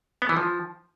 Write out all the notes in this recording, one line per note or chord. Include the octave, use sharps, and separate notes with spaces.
B3
E3
F3